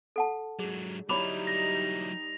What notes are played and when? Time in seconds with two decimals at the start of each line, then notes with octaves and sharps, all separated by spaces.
0.16 A4 F#5 A5
0.59 G#2 F#3 G#4
1.09 F#3 G3 D#4 E4 C#5 B5 D6 F7
1.47 A#6